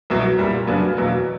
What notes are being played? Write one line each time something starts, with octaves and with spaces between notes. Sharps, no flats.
C2 B2 F#3
C2 A#2 G3
F#2 C#3 F#3 B3 D4
E2 B2 F#3 A#3